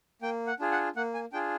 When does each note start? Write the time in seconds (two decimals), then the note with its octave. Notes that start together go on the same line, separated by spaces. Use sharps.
0.22 A#3 G5
0.47 F#5
0.59 D4 F4 G#4
0.71 F#5
0.96 A#3 F#5
1.14 G#5
1.33 D4 F4 G#4 G5